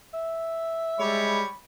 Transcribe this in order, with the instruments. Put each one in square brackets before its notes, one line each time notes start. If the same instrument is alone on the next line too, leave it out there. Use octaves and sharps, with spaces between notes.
[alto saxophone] E5
[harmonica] G3 C#5 [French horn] G#3 [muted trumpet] B5